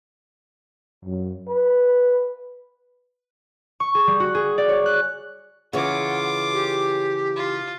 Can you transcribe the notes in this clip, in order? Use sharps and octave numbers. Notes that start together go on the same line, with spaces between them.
F#2
B4
C#6
G#4
G3
F#4
G#4
D5
C#5
F#6
C#3 E3 F4 F#5 D6
G4
F4